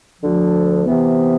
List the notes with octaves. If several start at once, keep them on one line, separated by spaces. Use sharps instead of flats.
D2 D3 F3
C3 E3 B3